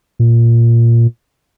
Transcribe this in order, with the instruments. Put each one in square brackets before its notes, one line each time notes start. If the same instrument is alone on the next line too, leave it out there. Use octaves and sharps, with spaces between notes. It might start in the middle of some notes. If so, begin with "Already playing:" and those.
[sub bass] A#2